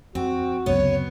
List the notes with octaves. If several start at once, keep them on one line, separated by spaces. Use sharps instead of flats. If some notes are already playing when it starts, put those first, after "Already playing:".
F2 C4 F#4
C#2 F#2 C3 B3 C#5